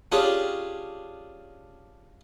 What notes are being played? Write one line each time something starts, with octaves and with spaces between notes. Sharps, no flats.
C#4 D4 F4 G4 G#4 C#5